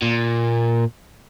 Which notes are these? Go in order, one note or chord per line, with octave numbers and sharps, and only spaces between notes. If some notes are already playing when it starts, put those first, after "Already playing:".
A#2